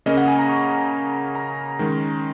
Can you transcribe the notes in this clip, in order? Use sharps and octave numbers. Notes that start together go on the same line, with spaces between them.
C#3 A#3 C#4 D#5
F#5
G#5
A#5
C#6
A#5
D#3 G#3 C#4